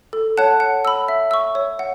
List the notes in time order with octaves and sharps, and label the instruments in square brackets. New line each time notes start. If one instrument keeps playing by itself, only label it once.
[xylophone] A4
C#5 F#5 A5 F#6
F#5
B5 E6
E5
C#6 E6
C#5
F#5